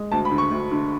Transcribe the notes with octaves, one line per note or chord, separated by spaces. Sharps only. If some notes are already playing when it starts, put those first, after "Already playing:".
Already playing: G#3
D2 A5
B5
D3
C#6
D2
D3